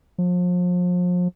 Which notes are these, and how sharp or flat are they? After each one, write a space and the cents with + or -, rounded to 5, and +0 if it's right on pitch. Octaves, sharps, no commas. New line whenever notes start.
F3 +35